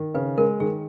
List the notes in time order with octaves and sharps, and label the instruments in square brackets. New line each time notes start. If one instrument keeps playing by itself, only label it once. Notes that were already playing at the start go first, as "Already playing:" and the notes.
Already playing: [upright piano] D#3
[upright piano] C#3 [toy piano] B4
[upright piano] G#3 [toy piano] A#4
[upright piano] D#3 [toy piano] G#4